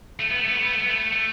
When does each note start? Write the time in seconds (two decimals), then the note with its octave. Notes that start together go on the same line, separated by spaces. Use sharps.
0.20 A3
0.29 B3
0.37 A3
0.46 B3
0.55 A3
0.63 B3
0.72 A3
0.81 B3
0.89 A3
1.12 A3